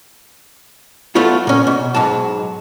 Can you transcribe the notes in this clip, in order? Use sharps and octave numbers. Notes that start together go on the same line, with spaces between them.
F#3 A3 B3 F4 F#4
A#2 C#4
B2
B1 G#2 F#3 A5